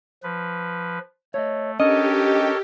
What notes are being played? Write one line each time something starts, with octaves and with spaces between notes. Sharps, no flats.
F3 B4
A3 C#5 D#5
C#4 D4 G4 A4 A#4 C#5 D#5